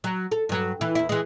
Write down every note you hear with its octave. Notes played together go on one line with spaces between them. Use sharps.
F#3
A4
G2 F#3
E3 E4
E2 E4
E3 G#3